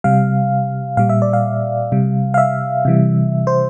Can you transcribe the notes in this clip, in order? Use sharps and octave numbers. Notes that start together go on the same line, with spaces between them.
C3 G3 F5
A#2 G3 F5
E5
D5
F5
C3 G3
F5
E5
C3 E3 G3
C5